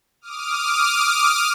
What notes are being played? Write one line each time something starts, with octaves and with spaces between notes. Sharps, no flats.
D6 D#6 F6